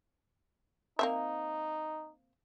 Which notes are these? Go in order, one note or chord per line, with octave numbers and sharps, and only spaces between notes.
A#3 C4 D#4 E5